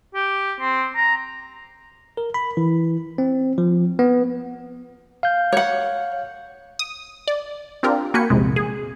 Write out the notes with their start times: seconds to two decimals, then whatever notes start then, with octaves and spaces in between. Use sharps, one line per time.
0.15 G4
0.60 C4
0.96 A#5
2.17 A#4
2.34 B5
2.57 E3
3.18 C4
3.58 F3
3.99 B3
5.23 F5 G6
5.52 C#5 F#5
6.79 D#6
7.28 D5
7.83 C4 D4 F4 G4 A#4
8.14 A#3 F#4 G5 G#5 B5 C#7
8.30 A#1 E2 C3 G#3
8.56 G#4